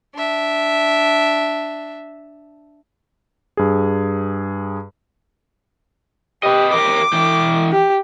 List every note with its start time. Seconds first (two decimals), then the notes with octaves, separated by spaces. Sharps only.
0.15 D4 E5
3.57 G2 G#4
6.43 G4 B4 D#5
6.74 G4 A#4 D6
7.13 E3 G5
7.72 G4